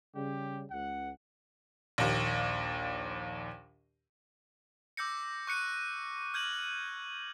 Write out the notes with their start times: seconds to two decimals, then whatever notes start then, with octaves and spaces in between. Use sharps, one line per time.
0.15 C#3 G3 G4
0.71 C#2 F#5
1.98 A#1 D#2
4.97 D6 E6 G6 A#6 C#7
5.47 C#6 F#6 C#7 D#7
6.34 F6 G6 G#6 D#7 F#7